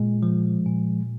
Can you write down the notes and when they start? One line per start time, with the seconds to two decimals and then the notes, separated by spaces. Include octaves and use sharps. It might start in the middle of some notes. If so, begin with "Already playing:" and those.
Already playing: A#2 G#3
0.23 F3
0.66 A#2